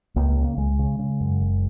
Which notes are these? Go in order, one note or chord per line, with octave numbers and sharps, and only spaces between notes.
C#2 A#3
A#3
C#3
A#3
C#2 G#3
C#3
C#3
F#2
F#1